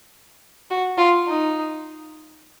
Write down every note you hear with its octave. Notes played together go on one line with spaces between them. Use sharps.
F#4
F4
D#4